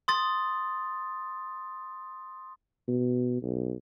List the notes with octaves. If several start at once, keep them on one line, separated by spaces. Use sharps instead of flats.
C6 D#6 A6
B2
B1